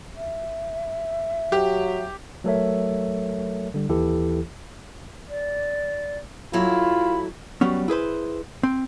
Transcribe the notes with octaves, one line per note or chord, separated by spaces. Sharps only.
E5
F#3 G4
F#3 A3 A4 A#4 C#5 E5
D3 G3
D#2 E3 E4 G4 A4
D5
F#3 E4 F4 A4 B5
F#3 G3 B3 C#4
E4 G#4 B4 C5
C4